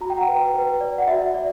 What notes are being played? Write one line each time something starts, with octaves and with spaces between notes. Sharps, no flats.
F#4 A#5
G5
F#5 A#5
B4
B4
D5
F#5
F#4 E5
D5